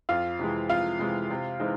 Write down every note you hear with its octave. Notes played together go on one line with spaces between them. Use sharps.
F2 F4 F5
C3 E3 G#3
F2 F4 F5
C3 E3 G#3
C3
E3 G#3 C4 D#4